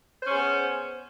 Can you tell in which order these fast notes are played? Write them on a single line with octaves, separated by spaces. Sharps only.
C5 C#4 G#4 B3